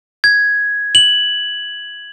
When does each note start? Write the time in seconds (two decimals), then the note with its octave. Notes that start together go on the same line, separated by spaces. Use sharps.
0.24 G#6
0.95 F#7